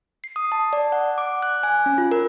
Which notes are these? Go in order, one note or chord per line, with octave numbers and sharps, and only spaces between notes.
C7
D#6
A5
D5
F#5
D6
F#6
G#5
C#4
F4
A#4